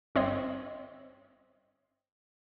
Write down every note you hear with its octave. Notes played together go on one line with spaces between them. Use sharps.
G1 C4 C#5 D#5